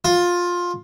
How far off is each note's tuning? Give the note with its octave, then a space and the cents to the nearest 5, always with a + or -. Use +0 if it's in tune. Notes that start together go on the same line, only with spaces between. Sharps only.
F4 +15